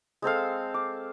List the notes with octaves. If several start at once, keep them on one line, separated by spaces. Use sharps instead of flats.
G#3 C4 A4 F5
D6